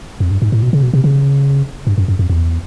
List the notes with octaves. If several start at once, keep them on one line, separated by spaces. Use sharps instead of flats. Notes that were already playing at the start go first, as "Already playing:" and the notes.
F2
G2
G#2
A2
B2
C#3
B2
C3
C#3
G2
F#2
F#2
F2
E2